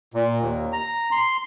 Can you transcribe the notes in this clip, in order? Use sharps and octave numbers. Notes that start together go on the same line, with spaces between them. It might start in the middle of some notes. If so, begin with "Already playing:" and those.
A#2
D#2
A#5
C6